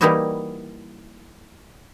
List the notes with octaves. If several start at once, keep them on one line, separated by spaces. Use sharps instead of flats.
E3 G3 A#3 D#4 E4 F#4